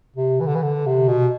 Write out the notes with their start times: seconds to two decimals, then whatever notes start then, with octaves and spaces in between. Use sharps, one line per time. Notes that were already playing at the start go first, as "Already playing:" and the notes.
0.16 C3
0.40 E3
0.47 D3
0.55 E3
0.63 D3
0.86 C3
1.08 B2